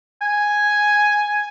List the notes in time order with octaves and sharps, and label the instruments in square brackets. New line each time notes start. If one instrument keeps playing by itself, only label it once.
[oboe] G#5